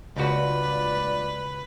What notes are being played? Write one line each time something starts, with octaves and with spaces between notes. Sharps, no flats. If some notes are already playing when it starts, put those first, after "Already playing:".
C#2 G2 A#2 F#4 B4 D5